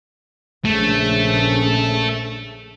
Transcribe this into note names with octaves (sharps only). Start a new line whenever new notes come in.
A#1 C#3 A3